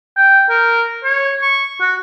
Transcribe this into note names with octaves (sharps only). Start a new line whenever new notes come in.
G5
A#4
C#5
C#6
F#4